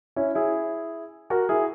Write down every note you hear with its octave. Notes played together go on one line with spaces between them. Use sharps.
C#4 E4
E4 G#4
F#4 A#4
E4 G#4